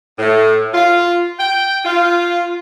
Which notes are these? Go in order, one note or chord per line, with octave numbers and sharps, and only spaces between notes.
A2
F4
G5
F4